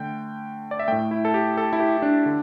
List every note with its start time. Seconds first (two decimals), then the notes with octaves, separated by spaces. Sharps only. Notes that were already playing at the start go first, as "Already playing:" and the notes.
Already playing: D3 A3 G5
0.71 D5
0.79 E5
0.88 A2 A3 G5
1.11 E4
1.25 A4
1.34 G4
1.57 A4
1.73 E4
1.80 G4
1.98 E4
2.02 D4
2.26 D3